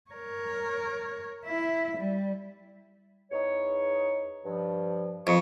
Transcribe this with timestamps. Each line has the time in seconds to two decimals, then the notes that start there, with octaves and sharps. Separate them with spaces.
0.10 A#4 C#5
1.45 E4 E5
1.97 G3
3.31 E2 D#4 C#5
4.45 G2 F3
5.27 F2 B4 D#5 C#6